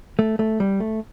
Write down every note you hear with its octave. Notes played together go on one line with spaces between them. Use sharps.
A3
A3
G3
A3